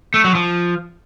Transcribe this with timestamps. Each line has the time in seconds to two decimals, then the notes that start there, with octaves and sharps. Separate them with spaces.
0.14 A3
0.24 F#3
0.35 F3